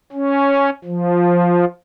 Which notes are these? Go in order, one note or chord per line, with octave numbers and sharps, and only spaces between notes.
C#4
F3